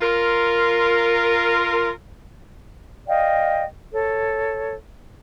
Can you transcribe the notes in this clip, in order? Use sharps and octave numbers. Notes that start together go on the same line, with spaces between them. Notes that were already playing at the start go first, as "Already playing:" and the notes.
F4 A#4
D5 D#5 F5 G5
A4 C#5